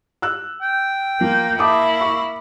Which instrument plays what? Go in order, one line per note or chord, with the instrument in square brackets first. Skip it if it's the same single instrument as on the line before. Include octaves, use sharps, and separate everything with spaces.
[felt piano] E6 F#6
[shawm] G5
[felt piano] F3 F4 [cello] A#3
[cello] A#3 E4 [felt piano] A5 D6 D#6
[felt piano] C#6